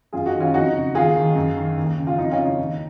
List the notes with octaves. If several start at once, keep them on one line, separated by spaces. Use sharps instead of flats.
F#2 F4 G#4
D#4 F#4
D#3
C#4 F4
F2 D#4 F#4
C#3
D#2 F4 G#4
D#3
F#2
D#3
D#2
C#3
F4
F2 D#4
C#4 F4
C#3
D#4
D#2